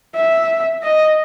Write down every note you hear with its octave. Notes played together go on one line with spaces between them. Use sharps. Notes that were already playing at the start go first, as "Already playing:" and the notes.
E5
D#5